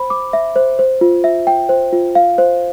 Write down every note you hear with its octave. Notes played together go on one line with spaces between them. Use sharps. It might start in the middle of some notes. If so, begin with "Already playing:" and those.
Already playing: C5 B5
D6
E5
C5
C5
F4
E5
G5
C5
F4
F5
C5